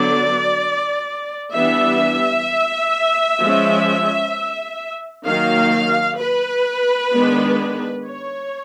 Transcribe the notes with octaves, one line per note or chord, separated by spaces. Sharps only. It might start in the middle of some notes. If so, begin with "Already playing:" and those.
Already playing: D3 F#3 B3 D5
E3 G3 B3 D4 E5
F3 G#3 C#4
D#3 F#3 A#3 F5
B4
D#3 G#3 B3 D4
C#5